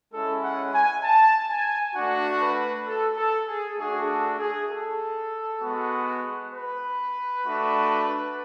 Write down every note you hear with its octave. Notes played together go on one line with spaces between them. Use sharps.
G#3 C#4 E4 A4
F#5
G#5
A5
G#5
A3 D4 F#4 F#5
B4
A4
A4
G#4
A3 D4 F#4 G#4
A4
G#4
A4
G#3 B3 F#4
B4
A3 D4 F#4